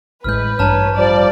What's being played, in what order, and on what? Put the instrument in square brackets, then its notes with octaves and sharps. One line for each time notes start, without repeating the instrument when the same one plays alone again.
[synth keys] A1 A2 G#3 [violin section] B4 [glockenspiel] F6 G6
[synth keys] A1 G2 [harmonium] C#5 [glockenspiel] A5 A#5 F6
[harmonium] F3 G3 [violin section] D5